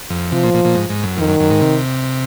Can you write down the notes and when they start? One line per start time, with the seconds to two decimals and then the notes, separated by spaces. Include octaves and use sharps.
0.10 F2
0.32 C3 F3
0.43 A#2
0.54 A#2
0.65 A#2
0.75 G#2
0.90 G#2
1.04 F#2
1.18 F2 D#3
1.29 F#2
1.40 F#2
1.50 G#2
1.61 C3